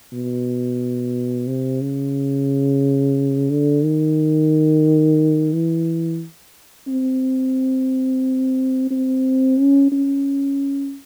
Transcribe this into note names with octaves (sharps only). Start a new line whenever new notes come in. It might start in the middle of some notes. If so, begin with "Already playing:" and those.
B2
C3
C#3
D3
D#3
E3
C4
C4
C#4
C#4